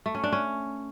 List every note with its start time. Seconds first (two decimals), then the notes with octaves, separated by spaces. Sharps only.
0.06 A3
0.15 C#4
0.24 D4
0.32 C#4